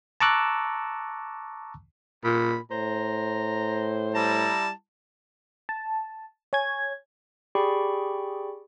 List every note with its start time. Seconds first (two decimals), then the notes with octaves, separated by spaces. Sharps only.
0.20 A5 A#5 C#6 D6 E6 F#6
2.24 A#2 B5
2.71 A2 C5 A#5
4.15 G3 E4 A5 A#5
5.69 A5
6.53 C#5 G#5 G#6
7.55 G4 G#4 D5 G5 B5 C#6